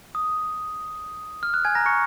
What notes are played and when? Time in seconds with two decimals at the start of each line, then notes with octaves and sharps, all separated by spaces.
0.15 D#6
1.43 F6
1.54 F#6
1.65 G#5 G#6
1.75 A#5 A#6
1.86 C#6 C#7